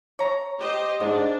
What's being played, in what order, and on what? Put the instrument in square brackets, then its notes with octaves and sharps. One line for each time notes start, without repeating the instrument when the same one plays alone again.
[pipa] C#5 A#5
[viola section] G4 C5 D#5
[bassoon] G#2 [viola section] D4 [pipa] D#5